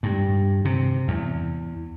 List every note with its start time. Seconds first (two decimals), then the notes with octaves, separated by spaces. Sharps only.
0.03 G2
0.65 C3
1.08 E2